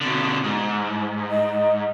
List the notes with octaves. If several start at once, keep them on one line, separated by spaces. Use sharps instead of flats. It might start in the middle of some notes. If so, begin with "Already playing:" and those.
B2 D3
G#2
D#5